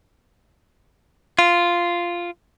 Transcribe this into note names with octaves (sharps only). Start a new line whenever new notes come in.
F4